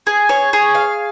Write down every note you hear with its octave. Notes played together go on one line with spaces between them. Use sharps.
G#4
C#5
G#4
F5